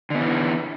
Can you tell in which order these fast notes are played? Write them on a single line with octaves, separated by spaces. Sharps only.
D3 B3 E3